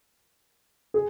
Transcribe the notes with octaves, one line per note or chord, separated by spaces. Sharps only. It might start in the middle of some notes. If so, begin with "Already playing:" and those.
G#4